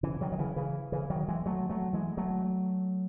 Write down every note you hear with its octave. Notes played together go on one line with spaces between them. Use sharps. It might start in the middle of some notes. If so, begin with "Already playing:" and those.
C#3 E3
D#3 F#3
D#3
C#3 E3
C#3 E3
C#3 E3
D#3 F#3
E3 G#3
F#3 A3
F#3 A3
E3 G#3
F#3 A3